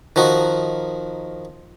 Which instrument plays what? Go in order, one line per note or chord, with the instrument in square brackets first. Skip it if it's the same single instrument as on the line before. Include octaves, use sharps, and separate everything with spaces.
[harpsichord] D#3 F3 F#4